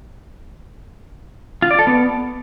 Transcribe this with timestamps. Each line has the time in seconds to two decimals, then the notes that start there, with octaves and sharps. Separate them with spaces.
1.62 F4
1.71 D5
1.79 A4
1.87 B3